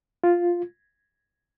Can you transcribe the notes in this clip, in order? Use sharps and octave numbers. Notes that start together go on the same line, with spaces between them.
F4